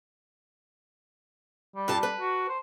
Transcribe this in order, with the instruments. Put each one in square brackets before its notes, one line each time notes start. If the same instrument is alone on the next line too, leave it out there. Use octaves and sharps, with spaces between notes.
[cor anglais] G3
[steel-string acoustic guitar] G2 F4 A5
B4
[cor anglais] F#4
C5